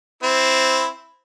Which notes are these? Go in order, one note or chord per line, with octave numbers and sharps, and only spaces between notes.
C4 E4